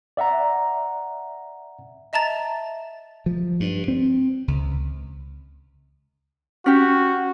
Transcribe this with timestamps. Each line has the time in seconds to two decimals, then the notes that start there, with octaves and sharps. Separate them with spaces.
0.17 D5 E5 F#5 A#5
2.13 D#5 E5 A5 A#5 A6
3.26 F3
3.60 G2
3.88 C4
4.48 C#2
6.66 C#4 F#4 G4